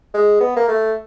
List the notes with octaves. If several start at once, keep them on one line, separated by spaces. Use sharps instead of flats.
G#3
B3
A#3
A3